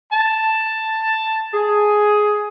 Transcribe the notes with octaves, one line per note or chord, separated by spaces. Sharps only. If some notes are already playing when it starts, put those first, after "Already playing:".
A5
G#4